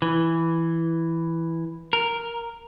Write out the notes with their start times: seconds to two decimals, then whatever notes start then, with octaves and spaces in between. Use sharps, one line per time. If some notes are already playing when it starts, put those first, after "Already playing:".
0.02 E3
1.93 A#4